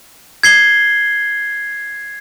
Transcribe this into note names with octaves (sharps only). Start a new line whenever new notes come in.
G#6 C7 G7